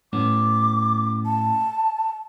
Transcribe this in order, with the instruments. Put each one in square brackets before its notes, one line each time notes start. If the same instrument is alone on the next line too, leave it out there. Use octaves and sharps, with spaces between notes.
[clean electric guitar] A2 B3 C#4 [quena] D6
[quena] A5